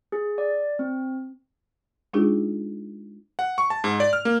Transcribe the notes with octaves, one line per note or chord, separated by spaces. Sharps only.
G#4
D5
C4
G#3 D4 D#4 F4 G#4
F#5
C#6
A5
G#2
D5
F6
A#3